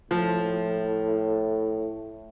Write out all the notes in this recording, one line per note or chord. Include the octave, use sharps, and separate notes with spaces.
A2 F3